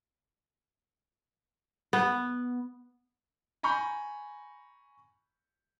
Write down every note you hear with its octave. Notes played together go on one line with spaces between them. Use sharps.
B3
G#5 A#5 B5 C#6 G6